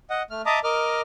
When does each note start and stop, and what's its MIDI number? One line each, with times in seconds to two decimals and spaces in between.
0.10 0.23 75
0.10 0.23 78
0.31 0.42 57
0.31 0.42 89
0.46 0.59 75
0.46 0.59 76
0.46 0.59 81
0.46 0.59 82
0.46 0.59 86
0.46 0.59 87
0.64 1.01 70
0.64 1.01 75
0.64 1.01 86
0.64 1.01 89